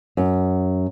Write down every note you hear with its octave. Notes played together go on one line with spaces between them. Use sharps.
F#2